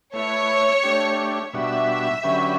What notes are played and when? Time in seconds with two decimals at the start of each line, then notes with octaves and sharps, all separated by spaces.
0.14 A3 E4 B4 C#5
0.83 A3 D4 G4
1.53 B2 G3 D4 F#4 E5
2.23 D3 F#3 C#4 G4 B4